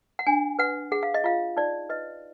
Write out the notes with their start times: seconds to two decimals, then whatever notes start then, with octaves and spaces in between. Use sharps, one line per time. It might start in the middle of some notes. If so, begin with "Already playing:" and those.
0.19 F#5
0.26 D4 G#5
0.59 B4 F#5
0.92 G#4 F#5
1.03 F5
1.14 D#5
1.24 F4 F5
1.57 D#4 D5
1.89 B4 D#5